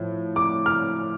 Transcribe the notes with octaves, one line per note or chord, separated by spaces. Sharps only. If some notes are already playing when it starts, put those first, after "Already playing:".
Already playing: A2 F3
D6
F6